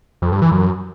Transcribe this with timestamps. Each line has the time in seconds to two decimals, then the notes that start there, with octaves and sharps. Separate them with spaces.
0.22 F2
0.32 G2
0.42 E3
0.52 F#2